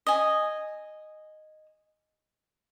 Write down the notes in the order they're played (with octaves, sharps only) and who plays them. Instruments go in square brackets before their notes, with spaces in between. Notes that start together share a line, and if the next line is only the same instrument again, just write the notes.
[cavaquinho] D#5 G#5